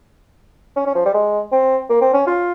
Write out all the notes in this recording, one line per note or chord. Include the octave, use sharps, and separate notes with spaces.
C#4
C#4
F3
G3
G#3
C4
A#3
C4
C#4
F4